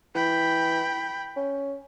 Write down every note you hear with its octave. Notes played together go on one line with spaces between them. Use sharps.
E3 G5 B5
C#4